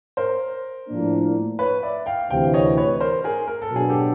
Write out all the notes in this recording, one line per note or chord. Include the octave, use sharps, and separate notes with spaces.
A#4 C5
A2 F3 A#3 D4
B4 C#5
D5 E5
F5 G5
D2 C3 E3 F5 G5
C#5 D#5
B4 C#5
A#4 C5
G#4 A#4
A#4
A4
B2 F#3 B3 D4 G#4
G4 A4